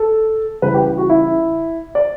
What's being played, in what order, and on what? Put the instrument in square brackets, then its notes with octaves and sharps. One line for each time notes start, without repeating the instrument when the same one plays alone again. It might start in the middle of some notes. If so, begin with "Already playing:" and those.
Already playing: [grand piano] A4
C#3 E3 G3 B4
G4
G4
F#4
E4
D5